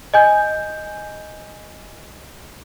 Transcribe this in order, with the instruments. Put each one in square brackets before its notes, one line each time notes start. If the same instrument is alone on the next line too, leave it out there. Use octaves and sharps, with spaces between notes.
[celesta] D#5 G#5 G6